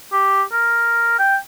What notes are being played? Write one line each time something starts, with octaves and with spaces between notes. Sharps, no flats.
G4
A#4
G5